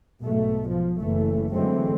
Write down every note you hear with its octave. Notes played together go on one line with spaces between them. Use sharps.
B1 G#2 B2 A3
F3
F#1 E3 A3
D3 E3 F#3 G#3 A3 C4